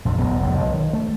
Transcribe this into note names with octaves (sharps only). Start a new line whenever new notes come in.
A#1 F2
D#1 B1 A#2 B3
E1 B1
B1
D#3
A3